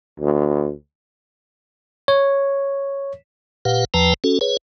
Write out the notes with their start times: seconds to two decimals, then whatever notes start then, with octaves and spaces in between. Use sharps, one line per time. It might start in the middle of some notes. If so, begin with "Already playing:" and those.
0.19 D2
2.08 C#5
3.65 A#2 G4 B4 F5 F#5
3.94 E2 F3 B4 G5 A5 A#5
4.24 C#4 F#4 A4
4.41 G#4 B4 C#5